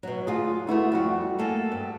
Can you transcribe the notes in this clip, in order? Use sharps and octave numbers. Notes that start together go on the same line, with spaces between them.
B2 F#3
D2 F4 G#4
A3 B3 E4 F#4
F2 G3 F#4
A3 A#3 A4 F#5 G#5
G2